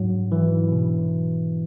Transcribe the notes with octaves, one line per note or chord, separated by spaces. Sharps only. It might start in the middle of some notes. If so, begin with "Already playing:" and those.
Already playing: G#2 F#3
E3
B2